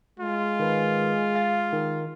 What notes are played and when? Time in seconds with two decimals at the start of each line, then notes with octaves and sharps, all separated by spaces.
0.20 G#3 F4
0.59 D#3 B4
1.35 F5 A6
1.72 D#3